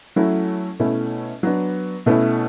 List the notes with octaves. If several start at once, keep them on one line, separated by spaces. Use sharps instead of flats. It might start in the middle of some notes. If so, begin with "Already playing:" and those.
F#3 A3 C#4 E4
B2 A3 C#4 E4
F#3 B3 D4
B2 A3 C#4 E4